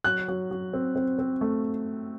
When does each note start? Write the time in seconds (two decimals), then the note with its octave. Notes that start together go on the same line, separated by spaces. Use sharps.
0.04 F#3 F#6
0.28 F#3
0.51 F#3
0.73 C4
0.96 C4
1.19 C4
1.41 A3